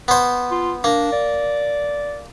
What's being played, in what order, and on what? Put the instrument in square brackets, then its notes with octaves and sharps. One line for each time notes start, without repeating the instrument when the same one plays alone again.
[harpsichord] B3 C5
[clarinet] F4
[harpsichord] A#3 [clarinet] D4
[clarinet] D5